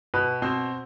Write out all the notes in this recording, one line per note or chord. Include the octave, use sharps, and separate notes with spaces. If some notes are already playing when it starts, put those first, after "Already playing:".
B2 B4
B2 C4 C5